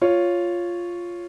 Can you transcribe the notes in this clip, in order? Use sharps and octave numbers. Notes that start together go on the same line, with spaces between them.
F4 C#5